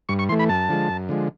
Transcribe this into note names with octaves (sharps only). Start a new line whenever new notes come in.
G2 C#6
C#6
E3 A3 C6
B5
F#2 A5
D3 F3 G#3
F#2
D3 F3 G#3